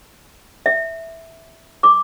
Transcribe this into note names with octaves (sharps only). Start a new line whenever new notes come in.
E5
D6